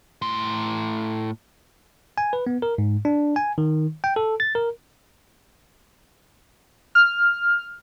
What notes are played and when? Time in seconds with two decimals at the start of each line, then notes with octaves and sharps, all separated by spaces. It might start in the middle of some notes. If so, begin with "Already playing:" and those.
0.22 A2 C6
2.18 G#5
2.33 B4
2.47 B3
2.62 A#4
2.78 G#2
3.05 D4
3.36 G#5
3.58 D#3
4.04 G5
4.16 A4
4.40 A6
4.55 A#4
6.95 F6